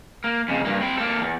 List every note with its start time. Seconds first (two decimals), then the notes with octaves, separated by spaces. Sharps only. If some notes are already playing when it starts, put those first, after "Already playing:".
0.24 A#3
0.49 F2 C#3
0.65 G2 A#3
0.81 C4 E4
0.97 A#3 A4
1.21 E2